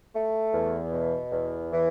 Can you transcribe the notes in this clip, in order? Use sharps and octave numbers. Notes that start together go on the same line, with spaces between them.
A3
E2
B2
E2
E3